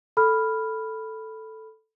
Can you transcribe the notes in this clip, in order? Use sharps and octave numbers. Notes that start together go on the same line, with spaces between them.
A4 B5 F6